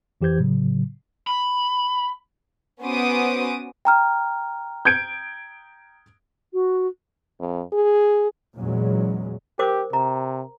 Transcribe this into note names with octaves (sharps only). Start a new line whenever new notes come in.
F2 E3 G4 C5 G6 G#6
A2 C#3 F#3
B5
B3 C#4 F#4 C5 D6 D#6
G5 A#5 F6
G6 G#6 D7
F#4
F2
G#4
E2 A#2 F#3 G#3 C#4
G4 A#4 C5 D6
C3 A#5